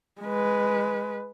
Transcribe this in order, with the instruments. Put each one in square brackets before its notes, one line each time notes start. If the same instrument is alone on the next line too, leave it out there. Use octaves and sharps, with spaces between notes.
[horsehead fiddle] G#3 B4